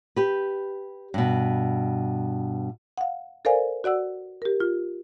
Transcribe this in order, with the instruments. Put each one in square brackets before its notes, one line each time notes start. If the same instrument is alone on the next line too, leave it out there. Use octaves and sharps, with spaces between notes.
[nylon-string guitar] G4 B4
G2 B2
[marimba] F5 F#5
A4 A#4 C5 D5 F5 G#5
F#4 D5 F#5 E6
G4 A#4
F4